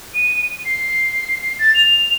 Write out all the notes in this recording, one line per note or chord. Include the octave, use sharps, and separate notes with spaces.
D#7
C7
A6
F7